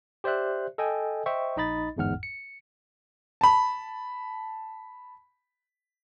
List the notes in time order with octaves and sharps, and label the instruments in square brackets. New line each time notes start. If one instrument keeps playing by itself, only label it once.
[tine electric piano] G4 C5 D5 E5 F#6
A4 D#5 G5 G#5
C5 D#5 E5 G5 C#6
A#1 D#4 D#5 B5 A6
G1 E2 G#2 F#5 F6
C#7
[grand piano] A5 B5